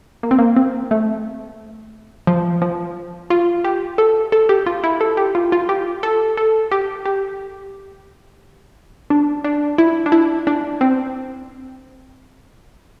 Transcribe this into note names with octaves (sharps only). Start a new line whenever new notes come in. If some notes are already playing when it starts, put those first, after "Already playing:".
A#3
C4
A#3
C4
A3
F3
F3
F4
G4
A4
A4
G4
F4
E4
A4
G4
F4
F4
G4
A4
A4
G4
G4
D4
D4
E4
D4
E4
D4
C4